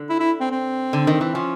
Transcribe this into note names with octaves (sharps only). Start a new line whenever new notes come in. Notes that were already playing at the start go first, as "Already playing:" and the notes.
Already playing: D3
E4
E4
C4
C4
D3
D#3
E3
F3 C#4